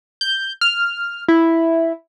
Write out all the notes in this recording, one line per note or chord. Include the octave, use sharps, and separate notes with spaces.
G6
F6
E4